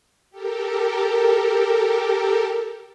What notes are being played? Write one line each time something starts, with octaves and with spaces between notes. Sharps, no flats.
G4 A4 A#4